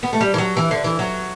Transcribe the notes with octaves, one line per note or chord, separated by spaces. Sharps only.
B3
A3
G3
E3
F#3
E3
D3
E3
F#3